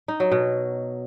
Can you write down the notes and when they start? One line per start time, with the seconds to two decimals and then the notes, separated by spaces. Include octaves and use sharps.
0.08 D#4
0.20 F#3
0.32 B2